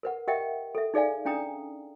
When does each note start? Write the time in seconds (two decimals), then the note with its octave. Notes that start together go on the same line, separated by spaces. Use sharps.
0.03 A#4 B4 F#5
0.28 G4 A#4 D#5 E5 F#5 G5
0.75 A4 E5
0.94 D#4 G#4 D5 F5 G#5
1.25 C#4 D4 G5 A#5 D#6